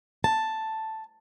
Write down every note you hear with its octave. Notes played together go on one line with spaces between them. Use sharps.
A5